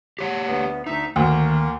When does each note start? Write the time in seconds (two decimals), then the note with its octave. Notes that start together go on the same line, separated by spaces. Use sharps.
0.19 G4 C#5 F#5
0.47 D2 B3
0.87 D2 D#4 E5
1.16 D2 D#3 A#3